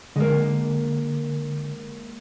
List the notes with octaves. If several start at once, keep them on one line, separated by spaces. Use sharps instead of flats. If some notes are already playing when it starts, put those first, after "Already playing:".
D3 G#3 A#3